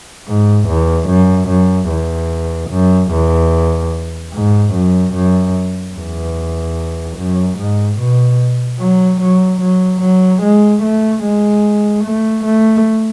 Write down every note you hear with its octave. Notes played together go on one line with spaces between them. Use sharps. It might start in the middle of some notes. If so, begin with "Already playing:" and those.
G#2
E2
F#2
F#2
E2
F#2
E2
G#2
F#2
F#2
E2
F#2
G#2
B2
F#3
F#3
F#3
F#3
G#3
A3
G#3
A3
A3